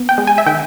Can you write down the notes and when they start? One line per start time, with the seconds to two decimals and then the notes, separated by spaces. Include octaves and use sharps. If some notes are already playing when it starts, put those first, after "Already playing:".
Already playing: B3
0.09 G5
0.18 G#3
0.27 G#5
0.38 E5
0.46 D#3 G5